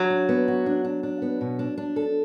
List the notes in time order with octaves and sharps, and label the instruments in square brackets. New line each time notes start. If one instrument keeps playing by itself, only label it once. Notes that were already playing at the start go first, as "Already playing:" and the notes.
Already playing: [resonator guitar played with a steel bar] F#3
[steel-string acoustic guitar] D4
B3
F#4
D4
D4
D4
B3
B2
D4
D4
A4